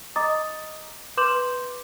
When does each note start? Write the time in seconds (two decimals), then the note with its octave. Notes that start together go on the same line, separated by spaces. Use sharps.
0.16 D#5 A#5 D6 D#6 A6
1.17 B4 C6 D6 G6 E7 F#7